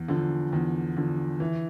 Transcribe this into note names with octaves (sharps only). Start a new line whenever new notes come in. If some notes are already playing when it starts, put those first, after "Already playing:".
Already playing: E2
D3 F3
E2
D3 F3
E3